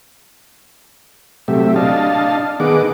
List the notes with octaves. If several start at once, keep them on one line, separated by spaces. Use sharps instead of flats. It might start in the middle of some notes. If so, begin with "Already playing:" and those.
C3 F#3 A3 G4 E5
D4 D#5 F5 A5
D#3 B3 G#4 D#5 F#5 D6